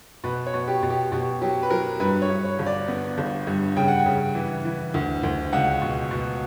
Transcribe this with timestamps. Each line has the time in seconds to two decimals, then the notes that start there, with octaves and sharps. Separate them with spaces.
0.24 B2 B4
0.46 C#5
0.54 B2
0.68 G4
0.83 B2
0.90 G4
1.12 B2 G4
1.42 F#3 G4
1.63 B4
1.70 F#3 A#4
2.00 G2 B4
2.22 C#5
2.30 G2
2.44 C#5
2.59 G1
2.66 D5
2.88 B3
3.18 G1
3.47 G2
3.76 C#3 G5
3.88 F#5
3.99 G5
4.06 C#3
4.35 E3
4.65 E3
4.94 D2
5.23 D2
5.53 C#2 F#5
5.82 B2
6.11 B2